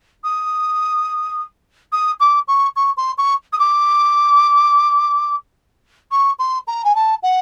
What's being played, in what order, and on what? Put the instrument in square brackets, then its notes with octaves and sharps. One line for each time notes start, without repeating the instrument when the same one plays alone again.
[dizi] D#6
D#6
D6
C#6
C#6
C6
C#6
D#6
D6
C#6
C6
A#5
G#5
A5
F#5